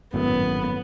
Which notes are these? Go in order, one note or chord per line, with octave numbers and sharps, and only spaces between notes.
G#1 F#2 A2 B3